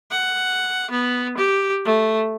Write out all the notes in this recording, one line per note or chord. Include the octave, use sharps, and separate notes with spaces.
F#5
B3
G4
A3